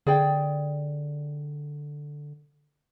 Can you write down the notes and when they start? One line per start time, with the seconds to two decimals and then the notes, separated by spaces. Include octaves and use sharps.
0.07 D3 G#4 D5 G5